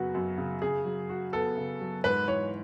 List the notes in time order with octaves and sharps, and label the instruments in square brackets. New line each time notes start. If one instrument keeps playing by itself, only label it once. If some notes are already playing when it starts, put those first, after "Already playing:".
Already playing: [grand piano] F#2 C#3 F#3 B3 [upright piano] F#4
[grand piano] F#2
C#3
[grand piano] C#3 [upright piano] G#4
[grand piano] F#3
F#4
[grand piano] B3 [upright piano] A4
[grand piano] C#3
F#3
[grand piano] G#2 [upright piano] B4
[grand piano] E3 [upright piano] C#5